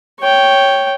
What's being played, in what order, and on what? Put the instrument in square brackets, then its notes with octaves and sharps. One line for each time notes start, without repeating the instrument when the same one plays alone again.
[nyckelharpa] C#5 G5